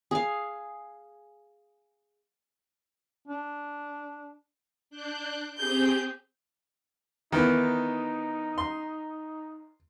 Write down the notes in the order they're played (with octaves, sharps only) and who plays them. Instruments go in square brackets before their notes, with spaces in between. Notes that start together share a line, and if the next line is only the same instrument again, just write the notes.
[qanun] G#4 F5
[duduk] D4
[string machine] D4 F#6 G6
[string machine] C4 G4 G#4 [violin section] G6
[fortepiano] D#3 E3 B3 [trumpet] D#4
[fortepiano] C6